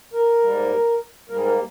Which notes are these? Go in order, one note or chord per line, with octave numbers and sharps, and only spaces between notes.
A#4
G#2 G3 A#3
G#2 G3 A#3 A#4
G#4
A#4